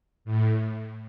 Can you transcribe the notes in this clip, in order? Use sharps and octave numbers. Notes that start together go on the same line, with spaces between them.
A2